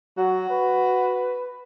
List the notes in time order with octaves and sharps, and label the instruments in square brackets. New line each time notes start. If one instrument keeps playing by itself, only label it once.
[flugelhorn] F#3 [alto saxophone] F#4
[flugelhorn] B4